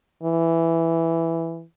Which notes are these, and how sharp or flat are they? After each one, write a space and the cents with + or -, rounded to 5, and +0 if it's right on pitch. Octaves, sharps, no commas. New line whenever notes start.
E3 +5